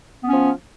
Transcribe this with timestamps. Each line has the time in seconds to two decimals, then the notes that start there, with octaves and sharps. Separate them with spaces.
0.23 B3
0.27 C#4
0.32 F3